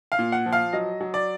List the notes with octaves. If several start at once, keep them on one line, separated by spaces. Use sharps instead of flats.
F5
A#2
F#5
F3
F5
F#3 D#5
F#3
D5